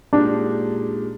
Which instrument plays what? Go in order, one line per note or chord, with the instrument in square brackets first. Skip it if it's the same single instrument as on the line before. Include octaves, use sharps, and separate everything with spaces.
[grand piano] A#2 G#3 D#4 G4 [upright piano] D4